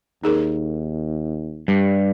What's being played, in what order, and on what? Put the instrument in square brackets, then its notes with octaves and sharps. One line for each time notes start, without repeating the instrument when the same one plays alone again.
[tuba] D#2 [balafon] D#4 G#4 A#4
[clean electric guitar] G2 [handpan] G3